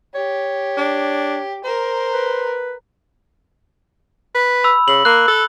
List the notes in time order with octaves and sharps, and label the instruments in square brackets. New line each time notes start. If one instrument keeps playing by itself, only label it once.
[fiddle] G4 [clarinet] C#5
[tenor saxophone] D4
[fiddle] A#4 [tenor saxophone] C5
[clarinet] B4
[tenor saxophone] B4
[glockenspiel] B5 E6
[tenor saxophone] C#3 [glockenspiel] F#7
[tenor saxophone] A#3 [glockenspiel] F#6
[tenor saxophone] A4